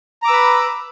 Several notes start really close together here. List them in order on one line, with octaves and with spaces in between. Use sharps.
A#5 D6 E6 B4 B5